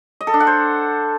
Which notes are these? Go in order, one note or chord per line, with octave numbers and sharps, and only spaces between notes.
D#5
A4
D4
F#5
C5